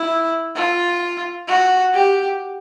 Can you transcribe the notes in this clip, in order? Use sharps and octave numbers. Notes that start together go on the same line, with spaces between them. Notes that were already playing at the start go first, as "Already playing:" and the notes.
Already playing: E4
F4
F#4
G4